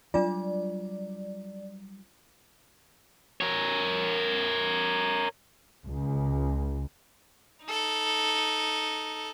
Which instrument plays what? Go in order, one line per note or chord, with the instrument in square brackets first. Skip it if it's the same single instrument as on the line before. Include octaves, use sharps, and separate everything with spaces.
[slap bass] F#3 G3 [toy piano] D4 F4 [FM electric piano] D5
[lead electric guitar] A#4 C#5
[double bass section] C#2
[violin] D#4 A4